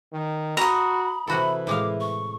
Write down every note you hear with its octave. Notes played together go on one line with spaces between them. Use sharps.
D#3
F#4 A#5 B5 D#6
C3 E3 F#4 A4 B5
A2 G#3 F5 D6
C#6